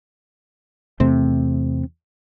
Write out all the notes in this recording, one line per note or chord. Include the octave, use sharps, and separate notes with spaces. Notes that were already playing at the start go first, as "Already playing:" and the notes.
E2 C3 A3 C4